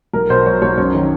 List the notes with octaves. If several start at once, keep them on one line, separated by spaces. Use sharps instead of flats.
B1 A#4
B2 C5
F#3 C#5
B1 C#5
F#2 C#5
D#3